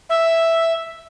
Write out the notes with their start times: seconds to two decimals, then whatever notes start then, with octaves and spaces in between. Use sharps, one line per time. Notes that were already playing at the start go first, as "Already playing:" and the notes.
0.10 E5